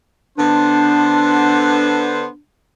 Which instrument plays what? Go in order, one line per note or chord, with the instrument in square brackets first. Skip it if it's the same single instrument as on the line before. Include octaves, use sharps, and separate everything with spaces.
[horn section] D3 B3 C5 [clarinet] D4